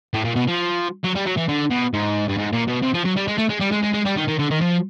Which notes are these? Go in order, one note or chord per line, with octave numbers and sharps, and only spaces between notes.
A2
A#2
B2
F3
F#3
G3
F#3
E3
D3
B2
G#2
G2
G#2
A#2
B2
C3
F3
F#3
G3
G#3
A3
G#3
G3
G#3
G#3
G#3
G3
D#3
D#3
D3
D#3
F3